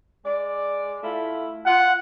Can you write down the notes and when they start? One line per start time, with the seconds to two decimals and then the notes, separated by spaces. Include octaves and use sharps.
0.24 G#3 D5
1.03 A3 E4 F4
1.66 F4 F#5